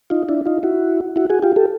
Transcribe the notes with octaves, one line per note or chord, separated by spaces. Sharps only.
D#4 F4
D4 E4
D#4 F4
E4 F#4
E4 F#4
F#4 G#4
F4 G4
G4 A4